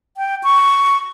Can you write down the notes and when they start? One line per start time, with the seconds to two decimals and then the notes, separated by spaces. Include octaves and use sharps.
0.17 G5
0.43 C#6